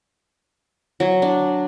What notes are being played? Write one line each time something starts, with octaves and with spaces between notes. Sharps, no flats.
F#3
D4